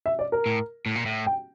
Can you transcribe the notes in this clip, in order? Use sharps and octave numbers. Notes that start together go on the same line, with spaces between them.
E5
D5
A#4
A2
A2
A#2
A2
G5